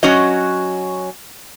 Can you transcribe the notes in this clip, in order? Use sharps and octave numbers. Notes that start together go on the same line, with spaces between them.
F#3 C#4 F#4 D#5